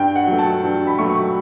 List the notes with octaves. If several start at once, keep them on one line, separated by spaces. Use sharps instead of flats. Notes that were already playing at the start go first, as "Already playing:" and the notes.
Already playing: G2 G5
F#5
F#3 A3
A5
G2
B5
F#3 A3 C#6